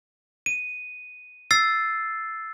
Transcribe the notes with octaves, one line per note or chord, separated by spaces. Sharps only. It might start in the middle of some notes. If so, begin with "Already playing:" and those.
D#7
E6 A6 C7